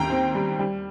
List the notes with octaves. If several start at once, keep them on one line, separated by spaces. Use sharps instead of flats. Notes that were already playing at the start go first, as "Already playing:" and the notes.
Already playing: D#2 G5 A#5
C4
G3
G3